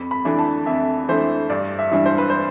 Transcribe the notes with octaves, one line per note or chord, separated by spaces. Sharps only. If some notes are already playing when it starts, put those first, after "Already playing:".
Already playing: F2 B5
B5
E3 A3 D4
A5
F2 E5
E3 A3 D4 C5
G2 D5
E5
E3 G3 D4
C5
B4
C5